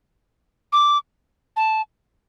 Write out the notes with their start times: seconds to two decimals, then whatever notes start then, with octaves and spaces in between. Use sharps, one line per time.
0.73 D6
1.56 A5